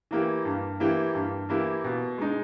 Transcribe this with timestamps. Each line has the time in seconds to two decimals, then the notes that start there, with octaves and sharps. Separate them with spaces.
0.11 E3 A#3 E4 G4
0.45 G2
0.80 E3 A#3 E4 G4
1.15 G2
1.49 E3 A#3 E4 G4
1.84 B2
2.18 G#3 D#4